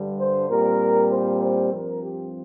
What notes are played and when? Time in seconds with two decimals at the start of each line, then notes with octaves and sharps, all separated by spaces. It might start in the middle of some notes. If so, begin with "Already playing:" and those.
Already playing: G2 D3 G3
0.18 C5
0.49 A#2 G3 C4 A#4
1.10 C5
1.41 C5
1.71 G2 F3 C4 A#4
2.02 G4